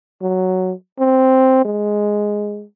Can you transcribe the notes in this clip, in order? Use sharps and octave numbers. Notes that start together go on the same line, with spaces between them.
F#3
C4
G#3